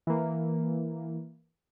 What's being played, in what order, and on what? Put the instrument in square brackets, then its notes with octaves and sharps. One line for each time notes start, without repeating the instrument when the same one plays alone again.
[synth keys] E3 A#3